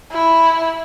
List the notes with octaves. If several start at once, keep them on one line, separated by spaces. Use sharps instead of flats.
E4